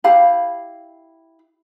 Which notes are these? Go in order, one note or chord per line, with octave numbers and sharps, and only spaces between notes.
E4 G4 F5 B5